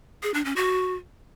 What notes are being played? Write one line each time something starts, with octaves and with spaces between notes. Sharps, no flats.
G#4
D4
C#4
F#4